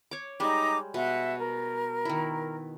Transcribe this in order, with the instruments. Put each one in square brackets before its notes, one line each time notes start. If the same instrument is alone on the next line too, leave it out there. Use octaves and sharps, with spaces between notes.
[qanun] C#5 D6
[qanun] G3 G#3 [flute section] D#4 A#5 D6
[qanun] B2 [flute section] E5 F#5
[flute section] A#4
[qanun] D#3 E4